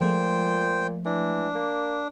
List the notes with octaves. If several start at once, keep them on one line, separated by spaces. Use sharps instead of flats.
A#2 F3 G#3 A3 C5 G5
E3 D4
A#3